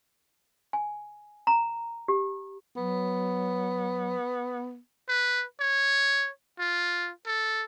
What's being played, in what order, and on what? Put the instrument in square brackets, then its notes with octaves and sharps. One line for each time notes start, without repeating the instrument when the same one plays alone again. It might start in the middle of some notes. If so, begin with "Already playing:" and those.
[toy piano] G#5
A#5
G4
[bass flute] F#3 [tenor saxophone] B3
[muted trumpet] B4
C#5
F4
A4